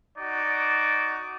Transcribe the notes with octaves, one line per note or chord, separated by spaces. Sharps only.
D#4 F#4 D5